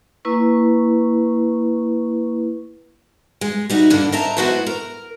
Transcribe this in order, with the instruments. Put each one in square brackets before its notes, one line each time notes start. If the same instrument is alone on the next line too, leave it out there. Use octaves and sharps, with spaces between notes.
[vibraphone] A#3 E4 B4 C#6
[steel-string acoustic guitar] G#3
G3 D#4 E4 F#4
G2 D3 A#3 D4
A#4 C5 D#5 E5 A5 A#5
G#3 B3 E4 F#4 B4 C5
A#4